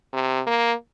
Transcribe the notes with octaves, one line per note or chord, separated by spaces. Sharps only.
C3
A#3